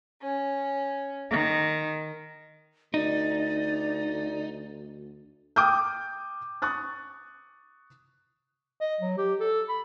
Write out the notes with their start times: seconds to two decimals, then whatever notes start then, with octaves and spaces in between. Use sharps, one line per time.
0.23 C#4
1.30 D#3
2.94 D2 D#4 D5
5.56 G5 D6 D#6 F6 G6
6.62 C#6 D#6 F#6 A6
8.81 D#5
9.01 F#3
9.18 G4
9.40 A4
9.69 B5